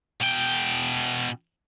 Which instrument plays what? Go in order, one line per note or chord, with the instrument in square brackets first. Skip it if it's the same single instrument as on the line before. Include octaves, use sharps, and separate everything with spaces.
[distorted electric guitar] B2 G5